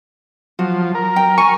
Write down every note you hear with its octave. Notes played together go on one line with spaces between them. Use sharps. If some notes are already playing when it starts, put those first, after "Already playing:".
F3 F#3 F#4
A#4
G5
G#5 C#6